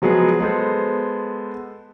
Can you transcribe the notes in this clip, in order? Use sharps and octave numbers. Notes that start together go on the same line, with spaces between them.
F3 F#3 G#3 B3 G#4
G#3 B3 A4 C5